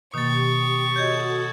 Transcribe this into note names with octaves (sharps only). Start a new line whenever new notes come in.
B2 D#3 A#3 G4 C#6 D#6 A6
F#4 A4 C#5 D#5 G6 G#6